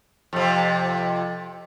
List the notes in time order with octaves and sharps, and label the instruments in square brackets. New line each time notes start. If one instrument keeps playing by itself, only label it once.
[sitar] F2 C3